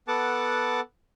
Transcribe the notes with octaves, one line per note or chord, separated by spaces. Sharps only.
B3 A4 F#5 A5 D6